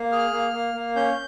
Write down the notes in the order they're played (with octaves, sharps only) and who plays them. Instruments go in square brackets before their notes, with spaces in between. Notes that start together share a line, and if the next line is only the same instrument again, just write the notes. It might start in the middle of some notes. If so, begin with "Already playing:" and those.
Already playing: [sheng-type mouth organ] A#3
G#4 F6
A#3
A#3
A#3
C#4 G6